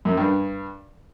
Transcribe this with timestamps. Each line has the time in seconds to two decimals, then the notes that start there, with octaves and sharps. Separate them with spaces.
0.05 F#2
0.17 G2